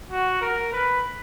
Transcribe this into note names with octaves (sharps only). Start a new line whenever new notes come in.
F#4
A#4
B4